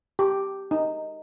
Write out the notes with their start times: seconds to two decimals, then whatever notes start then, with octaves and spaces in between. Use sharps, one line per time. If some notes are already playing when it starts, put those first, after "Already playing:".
0.19 G4
0.71 D#4